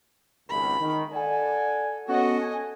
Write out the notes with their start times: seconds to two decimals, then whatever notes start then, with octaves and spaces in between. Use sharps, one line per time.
0.50 G#1 C#2 B5
0.79 D#3
1.12 A4 D5 F#5 G#5
2.08 B3 C#4 F#4 A4 D#5
2.40 G#5